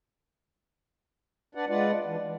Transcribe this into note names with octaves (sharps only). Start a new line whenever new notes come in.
D4 B4 D5 F#5
G#3 F4 B4 D5 F#5
E3 D4
E3